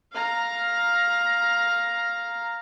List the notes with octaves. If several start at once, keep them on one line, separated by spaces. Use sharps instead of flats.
F5 A#5